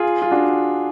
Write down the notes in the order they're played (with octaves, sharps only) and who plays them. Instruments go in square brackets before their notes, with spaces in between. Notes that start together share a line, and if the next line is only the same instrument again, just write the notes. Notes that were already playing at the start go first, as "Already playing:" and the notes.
Already playing: [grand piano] F4 G#4
F4
D4 F#4